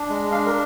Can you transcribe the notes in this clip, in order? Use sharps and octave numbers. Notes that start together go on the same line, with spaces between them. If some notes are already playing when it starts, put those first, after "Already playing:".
Already playing: D4
G#3
D4 F5
A#4